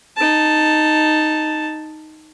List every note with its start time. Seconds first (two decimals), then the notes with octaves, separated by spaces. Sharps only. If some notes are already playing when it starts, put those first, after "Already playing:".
0.17 D#4 A5